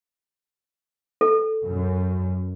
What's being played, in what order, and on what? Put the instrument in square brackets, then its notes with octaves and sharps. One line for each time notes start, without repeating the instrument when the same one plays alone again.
[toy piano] A4
[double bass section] F#2